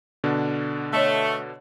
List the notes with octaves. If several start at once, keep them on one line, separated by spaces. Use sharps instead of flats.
B2 D3 D4
A3 C#5 D#5 A5